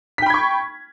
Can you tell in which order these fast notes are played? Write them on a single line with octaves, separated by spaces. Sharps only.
B6 G5 B5 G#6 C#6